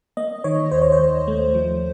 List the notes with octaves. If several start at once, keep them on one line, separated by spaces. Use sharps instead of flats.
A#3 D#5
D#3 C#5
D#2 C5
C#5
C5
D#2
A3
F3